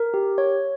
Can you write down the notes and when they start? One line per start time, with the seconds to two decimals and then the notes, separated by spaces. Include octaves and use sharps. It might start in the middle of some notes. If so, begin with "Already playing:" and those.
Already playing: A#4
0.14 G4
0.38 C#5